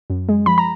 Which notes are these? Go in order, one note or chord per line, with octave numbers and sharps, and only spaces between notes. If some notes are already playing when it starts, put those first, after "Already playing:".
F#2
G#3
F3 B5
A#5